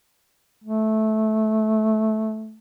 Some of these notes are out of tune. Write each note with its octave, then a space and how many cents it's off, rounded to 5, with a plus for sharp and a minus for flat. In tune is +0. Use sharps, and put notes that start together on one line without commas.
A3 -15